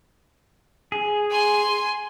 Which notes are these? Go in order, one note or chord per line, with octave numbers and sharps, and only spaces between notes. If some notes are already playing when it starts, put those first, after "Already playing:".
G#4
G#5 C6